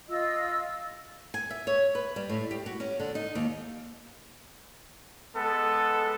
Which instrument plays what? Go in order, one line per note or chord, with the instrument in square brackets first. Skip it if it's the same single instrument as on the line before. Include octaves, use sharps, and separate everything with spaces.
[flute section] F4 D#5 E6
[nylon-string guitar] G#5
E5
C#5
B4
G3
A2
G4
F#4
C#4
D3
D#4
D#2
[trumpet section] G#3 B3 A4